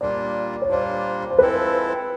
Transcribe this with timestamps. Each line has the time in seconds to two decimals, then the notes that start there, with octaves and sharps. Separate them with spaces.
0.01 A#2 G3 A#3 D4 F4 D5
0.62 C#5
0.70 A#2 G3 A#3 D4 F4 C5
1.30 C5
1.38 F3 G#3 C4 E4 A4 B4